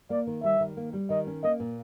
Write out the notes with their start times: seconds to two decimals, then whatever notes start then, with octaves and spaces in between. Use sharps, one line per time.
0.10 A#3 D5
0.27 D#3
0.43 G3 E5
0.60 D#3
0.77 A#3
0.93 G3
1.10 D#3 D#5
1.27 C#4
1.43 A#3 D#5
1.60 A#2